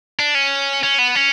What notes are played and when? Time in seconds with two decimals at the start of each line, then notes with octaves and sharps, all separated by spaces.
0.19 D4
0.35 C#4
0.83 C#4
0.99 B3
1.15 C#4